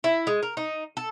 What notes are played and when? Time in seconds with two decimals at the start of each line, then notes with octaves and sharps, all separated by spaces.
0.04 E4
0.27 G#3
0.43 A#4
0.57 D#4
0.97 A4